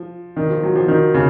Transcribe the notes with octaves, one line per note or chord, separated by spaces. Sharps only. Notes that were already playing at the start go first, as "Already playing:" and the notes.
Already playing: F3
D#3
F3
F#3
F3
D#3
C#3